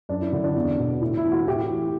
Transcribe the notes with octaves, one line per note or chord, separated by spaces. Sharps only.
F#2 D4
E4
D3 E4
D4
E2
B2
A2
E4
E3
F#4
A2 G4
E3